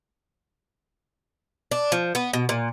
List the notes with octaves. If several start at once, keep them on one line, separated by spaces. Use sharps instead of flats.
D4
F3
B3
B2
A#2